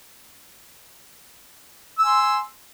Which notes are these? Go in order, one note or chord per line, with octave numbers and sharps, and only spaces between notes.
G#5 C6 E6